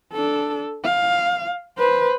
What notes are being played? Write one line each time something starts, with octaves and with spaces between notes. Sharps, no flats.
D4 A4
F5
B4 C5